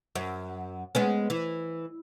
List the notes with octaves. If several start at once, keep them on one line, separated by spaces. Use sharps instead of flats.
F#2
G#3 B3 C#4
E3